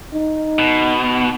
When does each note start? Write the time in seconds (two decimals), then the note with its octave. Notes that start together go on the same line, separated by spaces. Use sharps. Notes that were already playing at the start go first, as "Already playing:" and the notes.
0.14 D#4
0.59 B2